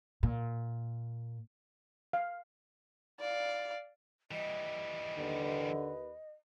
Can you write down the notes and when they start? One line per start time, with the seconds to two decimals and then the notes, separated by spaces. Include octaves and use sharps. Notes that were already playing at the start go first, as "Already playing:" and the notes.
0.23 A#2
2.13 F5
3.20 D5 F5
4.31 E3 G3 D#5
5.17 D#2 D3 B4